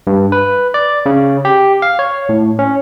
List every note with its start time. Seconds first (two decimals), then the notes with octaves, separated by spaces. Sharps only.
0.07 G2
0.32 B4
0.74 D5
1.06 C#3
1.45 G4
1.82 F5
1.99 C#5
2.29 A2
2.59 C#4